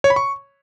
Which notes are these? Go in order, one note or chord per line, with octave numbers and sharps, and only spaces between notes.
C#5
B5
C#6